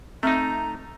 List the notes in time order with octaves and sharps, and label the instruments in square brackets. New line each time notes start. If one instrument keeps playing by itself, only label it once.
[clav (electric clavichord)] A3 D#4 [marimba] C4 E5 F6 [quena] A#5